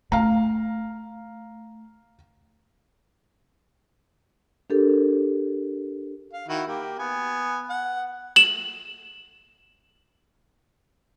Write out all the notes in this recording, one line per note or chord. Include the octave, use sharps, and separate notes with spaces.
A3 F5 A#5
D4 G4 A4 A#4
F5
D#3 E4 F#4
A#3 G4
B3 G#5
F#5
E7 F#7